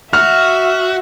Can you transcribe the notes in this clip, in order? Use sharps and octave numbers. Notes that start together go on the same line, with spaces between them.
F#4 E5 F6